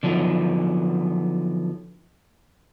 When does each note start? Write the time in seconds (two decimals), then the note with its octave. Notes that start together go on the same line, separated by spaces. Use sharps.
0.03 D3 F3 F#3 B3 D#4